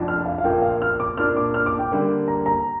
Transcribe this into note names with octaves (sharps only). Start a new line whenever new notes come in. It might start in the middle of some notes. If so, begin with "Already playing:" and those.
Already playing: F1 F2 F3 D4
F6
F5
F5
A#1 A#2 F3 A#3 G5
F5
F6
D6
A#2 A#3 D4 F6
D6
F6
D6
G5
D3 G3 A#3
A#5
A#5